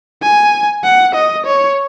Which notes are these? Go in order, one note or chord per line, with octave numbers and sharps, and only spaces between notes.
G#5
F#5
D#5
C#5